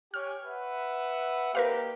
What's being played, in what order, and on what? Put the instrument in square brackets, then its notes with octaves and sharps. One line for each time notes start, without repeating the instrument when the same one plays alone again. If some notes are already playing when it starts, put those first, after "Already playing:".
[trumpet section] G4 C#5 G#5 [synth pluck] F6
[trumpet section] B4 E5 F#5
[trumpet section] A#3 D#4 G4 [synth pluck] A#4 B4 F5